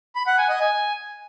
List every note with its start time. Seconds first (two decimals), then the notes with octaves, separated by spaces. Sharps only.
0.15 B5
0.27 F#5
0.38 G#5
0.49 D#5
0.61 G#5